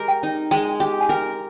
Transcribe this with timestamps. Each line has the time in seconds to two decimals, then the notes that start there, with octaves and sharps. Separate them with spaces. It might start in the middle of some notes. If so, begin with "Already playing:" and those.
Already playing: G#3 G4 A#4
0.08 G5
0.23 D#4
0.51 G#3 G5
0.80 G4 G5
1.01 G#5
1.09 A#4 G5